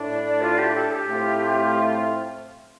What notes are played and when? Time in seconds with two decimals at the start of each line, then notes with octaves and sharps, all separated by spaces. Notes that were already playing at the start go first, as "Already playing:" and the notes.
Already playing: A2 A3 D4
0.10 D5
0.25 D5
0.42 F4
0.58 G4
0.75 A4
0.92 G4
1.08 A2 A3 C4 F4